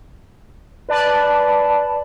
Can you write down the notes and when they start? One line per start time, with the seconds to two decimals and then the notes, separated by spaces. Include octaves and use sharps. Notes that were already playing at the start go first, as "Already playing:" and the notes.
0.89 B4 D5 A5 B5